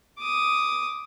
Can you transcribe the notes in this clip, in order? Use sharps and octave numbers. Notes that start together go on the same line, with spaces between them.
D6 D#6